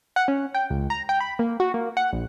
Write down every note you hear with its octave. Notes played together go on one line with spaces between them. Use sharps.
F#5
C#4
G5
C#2
A#5
G5
B5
A#3
F#4
A#3
F#5
A#1